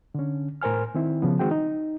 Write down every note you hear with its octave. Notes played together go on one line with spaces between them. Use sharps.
D3 C#4
A2 A#4 C5 G#5 F6
D#3 C4 E4
C#3 F3 B3
D#3 G#3 C4 F#4 G#4 G5
D#4